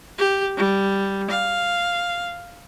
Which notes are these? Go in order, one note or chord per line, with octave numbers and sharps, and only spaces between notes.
G4
G3
F5